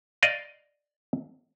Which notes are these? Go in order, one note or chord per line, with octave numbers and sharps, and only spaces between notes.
D5 D#5 F5